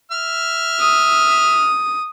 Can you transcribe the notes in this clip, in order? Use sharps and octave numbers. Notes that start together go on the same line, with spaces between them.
E5 F6
D#6